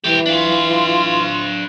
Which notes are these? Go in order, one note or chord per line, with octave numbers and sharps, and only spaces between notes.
E3 E4 G4
D4 F4 F5